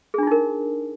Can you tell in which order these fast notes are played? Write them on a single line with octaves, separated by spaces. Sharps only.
G#4 D4 F4 D#4 A#4